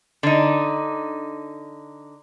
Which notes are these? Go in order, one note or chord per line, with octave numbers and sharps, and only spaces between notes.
D3 D#4